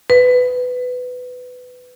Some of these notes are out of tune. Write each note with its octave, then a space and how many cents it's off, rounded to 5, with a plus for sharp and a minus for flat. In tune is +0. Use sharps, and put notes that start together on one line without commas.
B4 +15